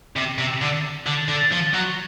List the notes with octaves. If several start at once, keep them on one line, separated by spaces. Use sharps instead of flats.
C3
C3
D3
D3
D3
F3
F#3